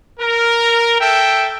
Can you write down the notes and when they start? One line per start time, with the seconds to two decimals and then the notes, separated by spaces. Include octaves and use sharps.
0.19 A#4
0.99 A4 E5 G5